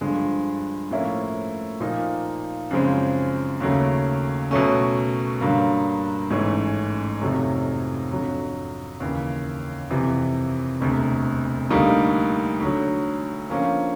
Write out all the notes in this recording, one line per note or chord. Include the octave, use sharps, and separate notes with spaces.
G2 D3 F3 G#3
A2 F3 A#3 C#4 E4
A#2 F3 A#3 D#4
F#2 C#3 F3 G#3 C4
D#2 C#3 F#3 A3
B2 F#3 A3 C#4
G2 D3 F#3 A#3
A1 G#2 E3 A3 C#4
F2 C3 D#3 F#3 A3
F2 D3 F#3
D#2 C#3 E3
F2 C3 E3
E1 D2 C3
D2 D3 G3 A#3 D#4
D2 D3 F#3
D3 F3 A#3 C#4